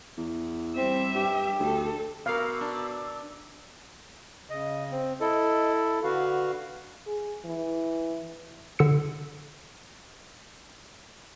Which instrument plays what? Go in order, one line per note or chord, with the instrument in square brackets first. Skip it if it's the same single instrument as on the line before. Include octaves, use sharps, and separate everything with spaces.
[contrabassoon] E2
[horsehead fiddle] G3 E5 [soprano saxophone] C4
[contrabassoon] G2 [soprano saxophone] G4
[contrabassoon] D2 [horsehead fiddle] A4
[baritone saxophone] B2 [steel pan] A#4 F5 [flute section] A#5 D6 E6
[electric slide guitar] D4
[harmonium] C#3 [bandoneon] D#5
[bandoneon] C4
[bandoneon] E4 A4 [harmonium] D#5
[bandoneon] D3 [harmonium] F#4 B4 F5
[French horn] G#4
E3
[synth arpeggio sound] D3 E6 C#7